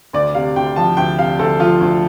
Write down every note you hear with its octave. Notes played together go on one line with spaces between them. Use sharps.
D2 D5
C3 F5
D2 G5
F3 A5
D2 G5
C3 F5
D2 A4
F3 F4
D2